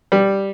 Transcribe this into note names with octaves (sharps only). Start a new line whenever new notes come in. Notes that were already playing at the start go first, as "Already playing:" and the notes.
G3